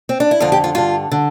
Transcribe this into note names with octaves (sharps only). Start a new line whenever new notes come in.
C4
D4
E4
F2 D3 F4
G4
F4
G2 D3 F4
D3